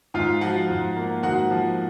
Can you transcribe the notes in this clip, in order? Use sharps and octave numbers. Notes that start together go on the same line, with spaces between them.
G#2 F4 F5
F3 F#4 F#5
G#2
A#3
G#2 F#4 F#5
F3